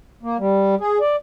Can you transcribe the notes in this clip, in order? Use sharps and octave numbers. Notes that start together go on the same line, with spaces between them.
A#3
G3
G#4
D5